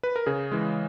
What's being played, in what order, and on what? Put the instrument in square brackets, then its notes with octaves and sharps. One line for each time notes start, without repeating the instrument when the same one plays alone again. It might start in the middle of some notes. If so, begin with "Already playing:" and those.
[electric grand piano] B4
A#4
C#3 G#4
E3 G#3